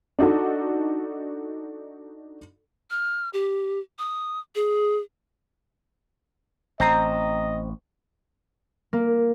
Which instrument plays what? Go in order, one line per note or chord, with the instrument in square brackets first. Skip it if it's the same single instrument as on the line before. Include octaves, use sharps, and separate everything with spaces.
[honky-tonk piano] D4 D#4 F#4 A4
[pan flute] F6
G4
D#6
G#4
[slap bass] A1 [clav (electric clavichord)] C4 [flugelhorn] D#5 [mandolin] A5 A#5 D#6
[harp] A#3